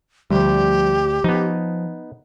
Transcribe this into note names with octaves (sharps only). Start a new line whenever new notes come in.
D2 F3 G3 G4
F3 B3 D#4